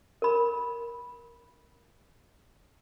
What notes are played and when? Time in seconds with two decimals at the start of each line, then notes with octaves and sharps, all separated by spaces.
0.22 A#4 B5